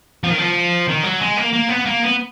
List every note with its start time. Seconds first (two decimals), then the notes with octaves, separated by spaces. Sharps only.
0.24 F3
0.30 D#3
0.38 F3
0.88 D#3
1.04 F#3
1.21 G#3
1.38 A#3
1.53 A#3
1.69 B3
1.86 A#3
2.03 B3